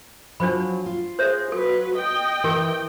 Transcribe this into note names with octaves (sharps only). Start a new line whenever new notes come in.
F3 F#3 D4 C5 B5
F4
G#4 C5 C#5 E5
F#3 A4 B4
D#5 G5
E3 G4 A#4